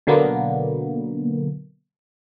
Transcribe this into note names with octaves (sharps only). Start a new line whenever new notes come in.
B2 D3 F#3 A#3 B3